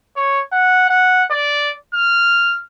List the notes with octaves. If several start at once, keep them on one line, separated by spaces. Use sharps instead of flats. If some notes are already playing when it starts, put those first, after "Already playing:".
C#5
F#5
F#5
D5
F6